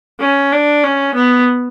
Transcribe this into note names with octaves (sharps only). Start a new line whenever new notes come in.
C#4
D4
C#4
B3